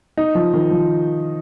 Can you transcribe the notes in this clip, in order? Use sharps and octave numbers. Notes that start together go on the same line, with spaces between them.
D#4
F3
D#3
F3